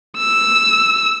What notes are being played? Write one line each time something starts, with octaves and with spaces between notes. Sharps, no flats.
E6